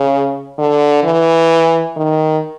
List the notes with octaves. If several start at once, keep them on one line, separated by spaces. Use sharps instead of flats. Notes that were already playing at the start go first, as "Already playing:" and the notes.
Already playing: C#3
D3
E3
D#3